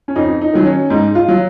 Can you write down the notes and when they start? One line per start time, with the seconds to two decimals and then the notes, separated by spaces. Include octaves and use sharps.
0.08 C#4
0.16 F2 D#4
0.41 D#4
0.53 D#3 F#3
0.65 C#4
0.90 G#2 D#4
1.15 F4
1.28 F#3